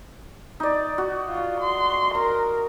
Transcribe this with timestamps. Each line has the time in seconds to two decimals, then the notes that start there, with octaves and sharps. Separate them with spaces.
0.60 D#4 D5
0.98 F#4
1.28 F4
1.61 C6
2.15 A#4 C6